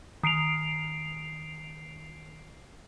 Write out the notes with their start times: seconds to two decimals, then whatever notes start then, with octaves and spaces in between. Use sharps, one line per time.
0.23 D#3 C7 D7 F7